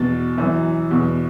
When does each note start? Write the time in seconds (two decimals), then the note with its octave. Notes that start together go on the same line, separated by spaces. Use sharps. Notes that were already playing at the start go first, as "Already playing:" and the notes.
Already playing: E2 B2 A6
0.37 F#2 E3
0.91 E2 B2